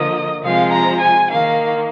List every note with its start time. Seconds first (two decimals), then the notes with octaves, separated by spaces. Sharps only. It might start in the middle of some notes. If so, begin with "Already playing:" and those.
Already playing: D3 F3 A#3 D#5
0.43 C3 F3 G#3 F5
0.73 A#5
1.01 G#5
1.30 D#3 A#3 F5